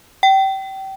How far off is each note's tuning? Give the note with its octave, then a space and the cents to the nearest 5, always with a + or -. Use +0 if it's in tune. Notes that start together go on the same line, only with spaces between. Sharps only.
G5 -25